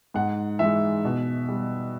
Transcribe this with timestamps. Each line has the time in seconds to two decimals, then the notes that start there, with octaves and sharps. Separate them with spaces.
0.14 G#2 F#5
0.59 E3 G#3 E5
1.05 B2
1.48 G3